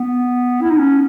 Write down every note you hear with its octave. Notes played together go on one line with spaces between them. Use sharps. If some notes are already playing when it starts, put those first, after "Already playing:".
Already playing: B3
E4
D#4
C#4